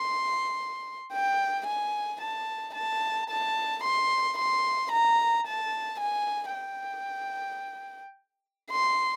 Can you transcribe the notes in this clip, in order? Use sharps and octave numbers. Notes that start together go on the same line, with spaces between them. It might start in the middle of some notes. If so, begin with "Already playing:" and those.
Already playing: C6
G5
G#5
A5
A5
A5
C6
C6
A#5
A5
G#5
G5
C6